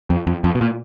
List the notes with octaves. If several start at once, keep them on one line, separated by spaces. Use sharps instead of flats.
F2
F2
F2
B2
A#2